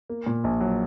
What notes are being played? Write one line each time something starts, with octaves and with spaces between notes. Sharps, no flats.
A#3
A#2
A#1
F#3